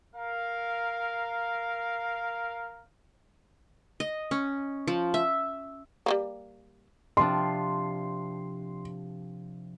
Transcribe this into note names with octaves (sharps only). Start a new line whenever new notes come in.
A#4 F5
D#5
C#4
F3
E5
G3 A3 A#3
C3 F3 D4 C6